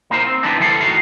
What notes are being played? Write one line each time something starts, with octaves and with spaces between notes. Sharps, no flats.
A#3 D#4 F4 C5
C4
E3 G#3 B3 C4 D4 D#4
D3 E3 G3 A4 F5
D#2 A2 D#3 D#4 F#4 F5